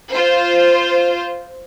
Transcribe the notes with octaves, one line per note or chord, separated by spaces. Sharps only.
F4 C5